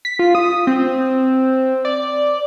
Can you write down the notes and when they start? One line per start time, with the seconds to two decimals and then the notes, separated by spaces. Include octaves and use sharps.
0.05 B6
0.19 F4
0.35 D#6
0.67 C4
1.85 D5